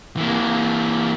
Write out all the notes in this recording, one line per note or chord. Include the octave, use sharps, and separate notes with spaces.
E3 A#3